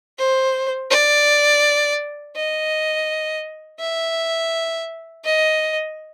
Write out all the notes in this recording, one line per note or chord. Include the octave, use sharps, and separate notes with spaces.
C5
D5
D#5
E5
D#5